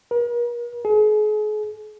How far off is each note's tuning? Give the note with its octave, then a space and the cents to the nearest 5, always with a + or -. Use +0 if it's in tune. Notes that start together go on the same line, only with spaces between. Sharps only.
A#4 +40
G#4 +40